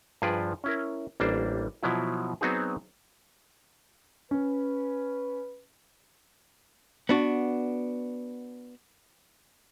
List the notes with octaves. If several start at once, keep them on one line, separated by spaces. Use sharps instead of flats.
G2 F3 G#4 B4 D5
C#4 E4 A#4
A1 G3 A#3 D4 C5
B2 F3 F#3 E4
F#3 B3 C4 D#4 F#4 G#4
C#4 B4
B3 D4 F#4